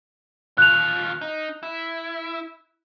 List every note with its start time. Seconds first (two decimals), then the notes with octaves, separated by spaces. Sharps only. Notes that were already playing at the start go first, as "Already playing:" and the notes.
0.58 D#2 F4 F#6 F7
1.21 D#4
1.63 E4